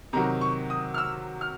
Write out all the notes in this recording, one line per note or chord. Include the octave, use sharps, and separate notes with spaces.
C3 D#3 F#3 A#5
C#6
D#6
F6
E6
F6